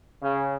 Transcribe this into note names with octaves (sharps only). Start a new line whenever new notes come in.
C#3